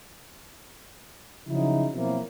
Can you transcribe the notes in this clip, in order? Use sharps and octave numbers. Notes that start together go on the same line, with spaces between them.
C#3 F3 F#3 D#4 E4
B2 F3 F#3 A#3 C4 E4